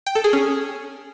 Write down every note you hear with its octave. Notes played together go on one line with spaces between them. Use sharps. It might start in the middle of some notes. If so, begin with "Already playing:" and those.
G5
A4
G#4
C#4